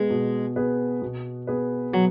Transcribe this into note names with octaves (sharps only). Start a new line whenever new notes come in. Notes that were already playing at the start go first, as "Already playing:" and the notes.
Already playing: B2 G#3 B3 G#4 B4
B2
B3 G#4 B4
B2
B3 G#4 B4
B2 F#3